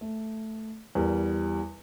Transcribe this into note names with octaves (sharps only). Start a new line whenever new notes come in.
A3
E2 G3 A#4